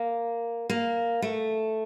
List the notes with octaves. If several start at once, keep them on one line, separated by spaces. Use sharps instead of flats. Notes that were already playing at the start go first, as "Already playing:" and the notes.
Already playing: A#3
A#3
A3